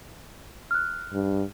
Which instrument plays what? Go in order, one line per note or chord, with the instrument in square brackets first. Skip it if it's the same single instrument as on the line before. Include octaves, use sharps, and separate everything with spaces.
[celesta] F6 F#6
[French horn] G2